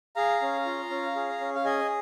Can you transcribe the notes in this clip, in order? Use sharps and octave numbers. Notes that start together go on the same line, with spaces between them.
G#4 F5 A#5
C#4
F4
C#4
G#4
C#4
F5
G#4 D#5 G#5